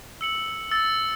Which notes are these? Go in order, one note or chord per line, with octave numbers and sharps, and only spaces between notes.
E6 C#7 F#7
E6 A6